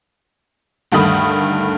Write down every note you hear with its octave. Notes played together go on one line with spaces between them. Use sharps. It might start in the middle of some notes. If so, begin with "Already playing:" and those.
D2 G2 D#3 A3 B5 D#6